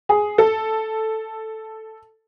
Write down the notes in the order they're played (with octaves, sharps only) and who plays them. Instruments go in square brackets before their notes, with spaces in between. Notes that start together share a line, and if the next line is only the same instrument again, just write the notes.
[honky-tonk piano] G#4
A4